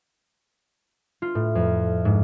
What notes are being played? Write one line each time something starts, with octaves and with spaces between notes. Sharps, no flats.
F4
A2
F2
G#2